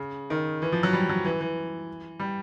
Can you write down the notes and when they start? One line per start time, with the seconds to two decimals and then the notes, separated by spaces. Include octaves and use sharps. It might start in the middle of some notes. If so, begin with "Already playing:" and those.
Already playing: C#3
0.30 D#3
0.62 E3
0.72 F3
0.83 F#3
0.93 G3
1.09 F#3
1.25 E3
1.41 E3
2.19 G3